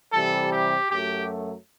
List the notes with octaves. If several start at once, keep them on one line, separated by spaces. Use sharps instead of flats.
C3 E3 G3 A4
G4
F#2 F#3 A3 G4